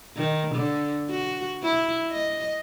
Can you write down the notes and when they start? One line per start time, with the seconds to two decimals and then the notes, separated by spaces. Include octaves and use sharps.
0.17 D#3
0.55 D3
1.10 F#4
1.63 E4
2.11 D#5